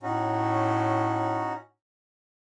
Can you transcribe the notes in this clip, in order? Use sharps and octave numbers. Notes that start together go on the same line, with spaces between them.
A2 C#4 D#4 F#4